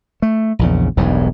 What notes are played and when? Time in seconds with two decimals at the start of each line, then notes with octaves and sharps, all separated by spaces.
0.22 A3
0.59 A#1 E2 C#3
0.97 E1 B1 E2 G2